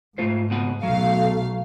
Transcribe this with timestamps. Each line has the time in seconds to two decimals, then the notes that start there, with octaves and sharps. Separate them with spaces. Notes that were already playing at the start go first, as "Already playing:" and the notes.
0.18 G#2 A3 F4 C5
0.50 C#2 B2 F#5
0.83 B1 F#3 A3 F5